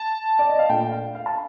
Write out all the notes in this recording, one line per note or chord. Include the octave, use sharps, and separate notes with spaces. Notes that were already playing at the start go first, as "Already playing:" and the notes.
Already playing: A5
D5
D#5
F5
A#2 A3 D4 G5
F5
F5
A5